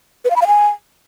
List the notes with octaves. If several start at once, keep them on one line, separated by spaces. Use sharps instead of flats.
B4
F5
B5
F5
G#5